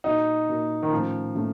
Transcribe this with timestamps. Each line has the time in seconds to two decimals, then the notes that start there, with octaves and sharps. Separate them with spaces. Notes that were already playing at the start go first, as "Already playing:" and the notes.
0.04 A#2 F#3 A#3 D#4
0.48 A#2 F#3 A#3
0.83 D#3
0.91 A2 F3 A3 C#4
1.35 A2 A3 C#4